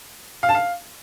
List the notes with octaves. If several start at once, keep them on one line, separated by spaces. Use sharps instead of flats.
F5
A5
F5